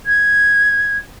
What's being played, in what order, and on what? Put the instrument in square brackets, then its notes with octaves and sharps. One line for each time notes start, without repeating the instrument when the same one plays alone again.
[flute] G#6